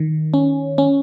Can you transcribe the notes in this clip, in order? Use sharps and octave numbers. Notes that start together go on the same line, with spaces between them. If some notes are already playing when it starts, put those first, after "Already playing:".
Already playing: D#3
C#4
C#4